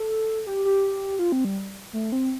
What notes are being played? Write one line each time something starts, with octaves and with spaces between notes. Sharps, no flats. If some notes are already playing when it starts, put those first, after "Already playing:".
Already playing: A4
G4
G4
F4
C4
G3
A3
C4